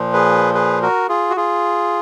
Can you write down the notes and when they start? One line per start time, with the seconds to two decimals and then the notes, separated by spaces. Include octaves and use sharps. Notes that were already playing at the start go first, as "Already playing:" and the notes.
Already playing: A#2 F3
0.13 G#4 B4
0.55 G#4 B4
0.82 F#4 A#4
1.09 F4 G#4
1.30 F#4
1.37 F4 G#4